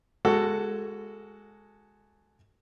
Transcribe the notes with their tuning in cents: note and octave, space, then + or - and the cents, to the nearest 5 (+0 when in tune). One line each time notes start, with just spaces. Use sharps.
G#3 +0 F#4 +10 A4 +15